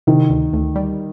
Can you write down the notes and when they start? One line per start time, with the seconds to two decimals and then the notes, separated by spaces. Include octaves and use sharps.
0.07 C3 D#3
0.30 D2
0.53 D2
0.75 G3